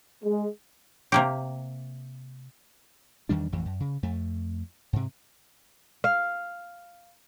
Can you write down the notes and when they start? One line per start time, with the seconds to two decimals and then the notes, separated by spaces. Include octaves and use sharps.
0.24 G#3
1.12 C3 A#3 G4
3.29 E2 D#3 G3 D4
3.52 A1 F2 E3
3.65 F#2
3.80 C#3
4.03 F2 A3
4.93 G#2 C3
6.04 F5